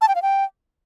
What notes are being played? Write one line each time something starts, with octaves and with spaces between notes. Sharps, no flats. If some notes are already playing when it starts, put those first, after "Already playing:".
A5
G5
F5
G5